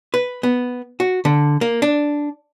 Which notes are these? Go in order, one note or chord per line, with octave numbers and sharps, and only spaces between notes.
B4
B3
F#4
D3
A#3
D4